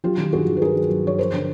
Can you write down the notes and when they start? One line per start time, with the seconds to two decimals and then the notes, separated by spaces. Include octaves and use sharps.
0.04 F#3 F4 G4
0.18 D#3
0.33 G2 F#4 G#4
0.48 D#3
0.57 B4
0.61 G2 G#4 A#4
0.75 F#3
0.90 F#3
1.04 G2 C#5
1.18 F3 A#4 C5
1.33 D3